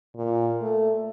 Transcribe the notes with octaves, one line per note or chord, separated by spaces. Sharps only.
A#2
A3